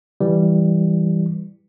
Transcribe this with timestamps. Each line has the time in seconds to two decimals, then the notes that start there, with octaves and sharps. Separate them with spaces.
0.20 E3 G3